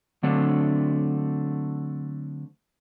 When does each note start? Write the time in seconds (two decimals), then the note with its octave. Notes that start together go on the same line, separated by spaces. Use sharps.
0.23 D3 F#3 A3 C4 D4